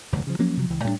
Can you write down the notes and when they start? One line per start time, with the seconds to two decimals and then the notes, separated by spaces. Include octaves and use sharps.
0.13 F1 D2 G2
0.27 C#3 F3
0.39 F3 F#3 A#3 C#4
0.57 C3 F3 F#3
0.70 C#2 E3
0.84 A2 G3 B3 D4